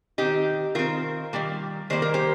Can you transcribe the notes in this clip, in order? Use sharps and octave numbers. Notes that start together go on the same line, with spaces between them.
D#3 C4 D#4 G4
D#3 C4 F4 A#4
D#3 G3 A#3
D#3 G3 A#3 C5
A#4
G4 C5